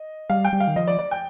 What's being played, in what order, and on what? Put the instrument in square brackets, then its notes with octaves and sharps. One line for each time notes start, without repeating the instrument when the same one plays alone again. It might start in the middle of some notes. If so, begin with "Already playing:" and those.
Already playing: [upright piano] D#5
[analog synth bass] G3 [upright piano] F5
[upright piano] G5
[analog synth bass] G3
[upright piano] F5
[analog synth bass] D#3
[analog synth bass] F3 [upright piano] D#5
[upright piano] D5
D5
G5